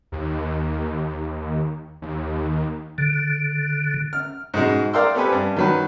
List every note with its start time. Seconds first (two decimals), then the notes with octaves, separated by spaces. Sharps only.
0.12 D#2
2.02 D#2
2.98 D3
4.13 F6
4.54 G#2 B2 G#3
4.93 A#4 D5 F5 G5 C6 E6
5.14 B3 C4 G4 A4 B4 G#5
5.32 G2
5.56 D#3 F#3 B4